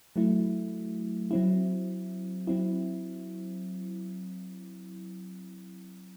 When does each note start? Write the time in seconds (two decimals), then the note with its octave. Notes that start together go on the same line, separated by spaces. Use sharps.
0.16 F#3 A3 E4
1.31 F#3 C4 E4
2.47 F#3 C4 E4